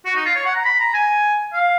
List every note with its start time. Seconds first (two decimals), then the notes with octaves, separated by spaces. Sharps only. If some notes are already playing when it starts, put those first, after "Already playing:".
0.05 F#4
0.16 D#4
0.25 F4
0.35 C#5
0.45 F#5
0.55 A#5
0.65 B5
0.80 A#5
0.94 G#5
1.53 F5